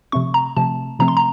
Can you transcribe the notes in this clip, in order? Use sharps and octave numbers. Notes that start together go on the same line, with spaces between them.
C3 F3 A3 C4 C#6
A#5
C3 F3 A3 C4 A5
C3 F3 A3 C4 A#5
C6
A#5